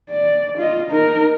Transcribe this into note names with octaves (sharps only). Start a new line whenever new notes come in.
D5
F4 D#5
D#4 A#4